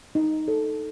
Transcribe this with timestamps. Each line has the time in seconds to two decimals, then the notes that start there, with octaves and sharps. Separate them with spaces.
0.15 D#4
0.48 A4 C#5